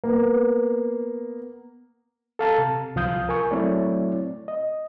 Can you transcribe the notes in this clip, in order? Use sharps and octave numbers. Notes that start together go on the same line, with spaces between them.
A#3 B3
A4 F5 A5 A#5
C3
C2 F3 F5 D#6 G6
A#4 G#5 C#6
F#3 A3 C4 E4 C#5 D5
D#5